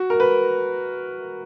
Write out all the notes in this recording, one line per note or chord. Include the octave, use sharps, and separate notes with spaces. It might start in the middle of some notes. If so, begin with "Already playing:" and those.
Already playing: F#4
A#4
B4